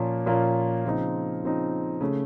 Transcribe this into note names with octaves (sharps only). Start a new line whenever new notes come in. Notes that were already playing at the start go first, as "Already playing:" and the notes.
Already playing: A#2 F3 A#3 C#4 F4
A#2 F3 A#3 C#4 F4
C#3 F3 C4 D#4
C#3 F3 C4 D#4
C#3 A3